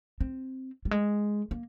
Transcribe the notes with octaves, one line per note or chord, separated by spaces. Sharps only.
C4
G3
G#3
A#3